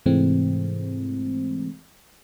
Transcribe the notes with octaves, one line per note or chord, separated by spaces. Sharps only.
G#2 C3 E3 G#3 A3 C4